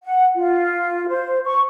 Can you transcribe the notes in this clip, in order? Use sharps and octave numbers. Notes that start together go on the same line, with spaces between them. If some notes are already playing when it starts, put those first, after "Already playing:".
F#5
F4
C5
C#6